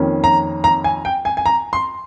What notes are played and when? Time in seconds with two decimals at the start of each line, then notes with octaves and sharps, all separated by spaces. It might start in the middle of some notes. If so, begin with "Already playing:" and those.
Already playing: F2 D#3 A#3 C#4
0.24 A#5
0.64 A#5
0.84 G#5
1.05 G5
1.25 G#5
1.37 G#5
1.46 A#5
1.73 C6